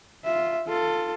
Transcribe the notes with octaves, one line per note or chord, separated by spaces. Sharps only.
F4 E5
F4 A4